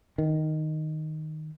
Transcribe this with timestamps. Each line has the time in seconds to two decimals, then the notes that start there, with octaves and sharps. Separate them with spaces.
0.18 D#3